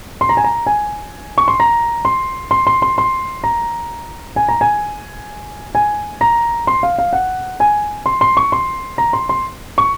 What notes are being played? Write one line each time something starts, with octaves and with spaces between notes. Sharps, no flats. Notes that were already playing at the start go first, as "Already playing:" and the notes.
C6
A#5
G#5
A#5
G#5
C#6
C6
A#5
C6
C6
C6
C6
C6
A#5
G#5
A#5
G#5
G#5
A#5
C6
F5
F5
F#5
G#5
C6
C6
C#6
C6
A#5
C6
C6
C#6